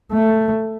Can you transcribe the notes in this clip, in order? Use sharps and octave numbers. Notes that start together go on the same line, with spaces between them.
A3